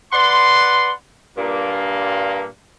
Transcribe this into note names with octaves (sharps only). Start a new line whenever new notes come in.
B4 D5 F#5 C6
G2 A#2 A#3